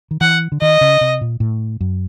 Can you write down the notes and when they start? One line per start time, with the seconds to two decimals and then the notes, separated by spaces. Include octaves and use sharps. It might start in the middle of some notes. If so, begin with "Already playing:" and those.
0.11 D#3
0.21 E3 F#5
0.52 D3
0.61 D#3 D#5
0.81 C#3
1.01 C3
1.21 A#2
1.40 A2
1.81 F#2